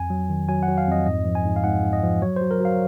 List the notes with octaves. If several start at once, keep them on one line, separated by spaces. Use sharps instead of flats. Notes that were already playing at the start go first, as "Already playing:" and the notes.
Already playing: F2 G#5
F#3
D#3
F#3 G#5
F#5
F#3
F5
F2 D#5
G#2 D#5
F3
G#5
G#2
F5
G#2 F#5
G#2
D#5
F3
F#3 C#5
F#3 C5
A#4
F#3 F5